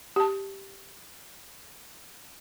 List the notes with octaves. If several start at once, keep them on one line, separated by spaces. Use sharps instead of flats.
G4 A5